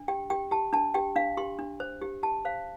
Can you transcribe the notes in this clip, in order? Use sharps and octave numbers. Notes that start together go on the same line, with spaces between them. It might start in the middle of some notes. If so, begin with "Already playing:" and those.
Already playing: D4
G4 G5
G4 G5
G4 A5
D4 A5
G4 G5
D4 F5
G4 C6
D4
C5
G4
G4 A5
C5 F5